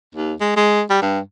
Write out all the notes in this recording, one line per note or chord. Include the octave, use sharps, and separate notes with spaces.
D#2
G#3
G#3
G3
G2